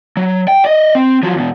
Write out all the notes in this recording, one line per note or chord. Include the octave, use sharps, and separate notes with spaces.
F#3
G5
D5 D#5
C4
F3 F#3
E2 B2